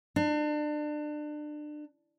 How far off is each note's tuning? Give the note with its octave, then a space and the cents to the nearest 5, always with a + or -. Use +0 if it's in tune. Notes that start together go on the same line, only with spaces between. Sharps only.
D4 +30